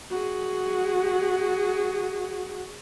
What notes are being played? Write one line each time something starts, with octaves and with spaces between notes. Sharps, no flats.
F#4 G#4